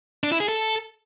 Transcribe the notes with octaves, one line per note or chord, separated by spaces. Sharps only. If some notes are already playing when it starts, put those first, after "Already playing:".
D4
E4
G#4
A4